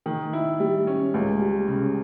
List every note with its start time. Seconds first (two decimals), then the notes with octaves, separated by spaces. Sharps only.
0.06 D#3
0.33 E4
0.60 G3
0.87 C#4
1.14 C#2
1.41 G3
1.68 C#3